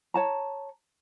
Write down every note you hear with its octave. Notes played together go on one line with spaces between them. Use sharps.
C#5 A5 A#5